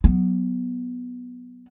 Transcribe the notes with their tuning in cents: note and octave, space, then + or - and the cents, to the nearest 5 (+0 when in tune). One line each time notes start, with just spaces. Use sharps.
F#3 +0 B3 +0